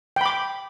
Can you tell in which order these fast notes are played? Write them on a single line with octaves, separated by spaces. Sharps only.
G5 B5 D6